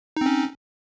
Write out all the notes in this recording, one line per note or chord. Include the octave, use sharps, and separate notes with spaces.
C4 C#4 D#4